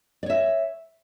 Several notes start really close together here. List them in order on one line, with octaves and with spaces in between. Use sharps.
D5 C#5 E5